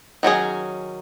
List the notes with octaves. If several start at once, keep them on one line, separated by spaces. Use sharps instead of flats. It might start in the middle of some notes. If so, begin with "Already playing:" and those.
D#3 F#3 C#4 G#4